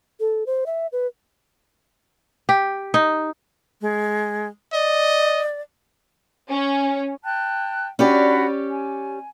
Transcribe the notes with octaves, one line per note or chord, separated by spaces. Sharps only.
A4
C5
E5
B4
G4
D#4
G#3
D5 D#5
C#4
G5 A5 F#6
C#4 D4 F#4 G4 D5 B5
G#5